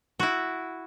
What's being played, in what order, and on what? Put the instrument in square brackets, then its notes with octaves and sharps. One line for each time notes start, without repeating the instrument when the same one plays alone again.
[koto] E4 F#4